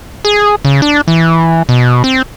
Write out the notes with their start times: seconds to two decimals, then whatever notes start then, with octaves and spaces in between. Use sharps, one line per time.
0.25 G#4
0.65 C#3
0.82 D4
1.08 E3
1.69 B2
2.04 C4